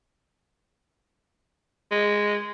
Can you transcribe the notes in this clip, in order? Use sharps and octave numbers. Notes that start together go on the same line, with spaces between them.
G#3